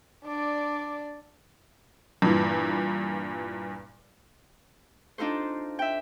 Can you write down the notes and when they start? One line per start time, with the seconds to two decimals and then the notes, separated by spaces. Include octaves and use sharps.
0.24 D4 D5
2.22 G2 A#2 E3
5.18 D4 D#4 F4 A4 C5
5.79 E5 G5